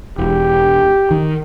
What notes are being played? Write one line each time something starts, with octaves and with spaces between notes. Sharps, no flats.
E1 G4
D#3